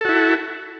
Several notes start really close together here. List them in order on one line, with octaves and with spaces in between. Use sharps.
A4 F#4 E4